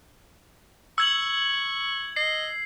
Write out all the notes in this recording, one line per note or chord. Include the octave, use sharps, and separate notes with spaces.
C#6 E6 G#6 F#7
D#5 C7